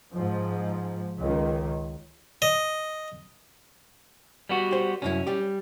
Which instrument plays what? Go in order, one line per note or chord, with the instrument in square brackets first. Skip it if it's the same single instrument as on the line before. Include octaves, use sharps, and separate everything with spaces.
[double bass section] G#2 F3
C#2 D#3
[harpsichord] D#5
[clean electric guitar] G3 B3 F#4
[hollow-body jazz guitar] G4 C5
[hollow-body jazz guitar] C2 F#2 E4 [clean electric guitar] C#4
[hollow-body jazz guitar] G3 G4